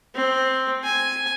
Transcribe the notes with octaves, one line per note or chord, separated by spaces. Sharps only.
C4
G#5